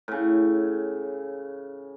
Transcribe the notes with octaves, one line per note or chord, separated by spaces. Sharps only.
A2 C#3